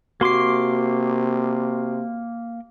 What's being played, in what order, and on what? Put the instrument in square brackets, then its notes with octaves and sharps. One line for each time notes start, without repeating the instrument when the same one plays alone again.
[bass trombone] C3 [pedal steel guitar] A#3 C6 D6 [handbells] F#4 C7